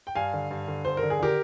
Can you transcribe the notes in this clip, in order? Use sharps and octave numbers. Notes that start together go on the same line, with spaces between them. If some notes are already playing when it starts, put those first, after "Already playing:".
G5
G2 F5 G#5
D3
G2
D3
G2 C5
A#4
D3
G#4
D3 G4 A#4